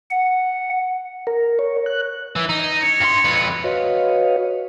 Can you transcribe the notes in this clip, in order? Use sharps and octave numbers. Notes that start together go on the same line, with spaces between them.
F#5
A#4
C#5
F#6
E3
D#4
C#5
G2 C6
F2 B4
F#4 B4 C#5 D#5 F5